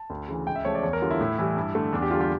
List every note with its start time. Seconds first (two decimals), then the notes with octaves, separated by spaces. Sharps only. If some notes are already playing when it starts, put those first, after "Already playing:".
Already playing: A5
0.10 D2
0.28 C#3 E3
0.47 C#2 G5
0.56 E5
0.65 C#3 F3 A3 C#5
0.75 D5
0.83 E2 C#5
0.93 A#4
1.02 D3 G3 F4
1.11 E4
1.21 A2
1.38 E3 G3
1.56 G2
1.75 D3 A3
1.92 E2 D4
2.02 G4
2.11 D3 G3 F4
2.21 G4